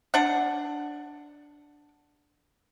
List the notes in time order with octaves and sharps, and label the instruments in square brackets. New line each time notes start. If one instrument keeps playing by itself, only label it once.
[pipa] D4 F#5